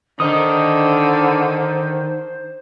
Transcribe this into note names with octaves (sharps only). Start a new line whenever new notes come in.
D3 D#3 D#4 C5 D#6